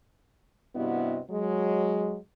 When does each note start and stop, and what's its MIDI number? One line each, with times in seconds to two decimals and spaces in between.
0.76 1.19 43
0.76 1.19 48
0.76 1.19 59
0.76 1.19 64
0.76 1.19 66
0.76 1.19 75
1.31 2.17 54
1.31 2.17 56